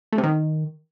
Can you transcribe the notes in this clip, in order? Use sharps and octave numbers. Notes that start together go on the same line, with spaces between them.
A3
C3
D#3